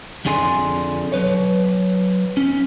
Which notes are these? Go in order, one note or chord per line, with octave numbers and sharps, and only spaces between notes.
F2 D3 G#4 D5 G#5 C6
F#3 B4 C#5
C#4